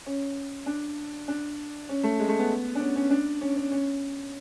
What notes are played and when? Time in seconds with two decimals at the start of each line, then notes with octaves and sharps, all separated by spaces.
0.06 C#4
0.66 D4
1.28 D4
1.89 C#4
2.03 A3
2.20 G#3
2.29 A3
2.39 B3
2.75 D4
2.80 C#4
2.96 C#4
3.11 D4
3.41 C#4
3.56 C#4
3.72 C#4